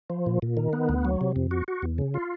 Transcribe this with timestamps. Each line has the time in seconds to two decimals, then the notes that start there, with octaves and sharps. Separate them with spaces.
0.10 F3
0.26 A#2
0.42 A#2
0.57 D#3
0.73 B3
0.89 D2
1.05 F#3
1.21 C3
1.36 F2
1.51 F#4
1.68 F#4
1.82 E2
1.98 C#3
2.14 F4